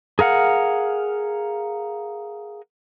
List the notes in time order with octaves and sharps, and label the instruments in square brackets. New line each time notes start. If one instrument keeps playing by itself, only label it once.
[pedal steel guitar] G#4 A#4 F5 F#5